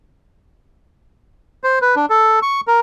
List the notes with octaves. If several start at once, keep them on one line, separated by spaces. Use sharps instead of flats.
C5
B4
D4
A4
C#6
A#4